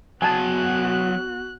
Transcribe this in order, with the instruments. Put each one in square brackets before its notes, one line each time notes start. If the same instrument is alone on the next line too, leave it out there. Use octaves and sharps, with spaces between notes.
[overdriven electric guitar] F#3 G#4 [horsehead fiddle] B3 F#4 [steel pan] G#5 A5 [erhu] F#6